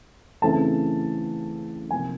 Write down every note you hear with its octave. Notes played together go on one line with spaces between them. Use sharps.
C#3 E3 A3 C4 A5
C3 F3 A#3 G#5